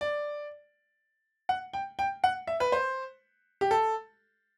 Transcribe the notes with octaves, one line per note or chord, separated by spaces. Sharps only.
D5
F#5
G5
G5
F#5
E5
B4
C5
G4
A4